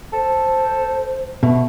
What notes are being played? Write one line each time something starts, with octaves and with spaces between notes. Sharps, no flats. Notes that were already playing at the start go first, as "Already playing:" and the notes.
A4 C5
B2 A3